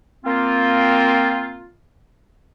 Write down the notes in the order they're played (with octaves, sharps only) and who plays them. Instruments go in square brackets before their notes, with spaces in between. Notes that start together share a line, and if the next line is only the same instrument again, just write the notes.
[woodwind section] A#3 C4 F4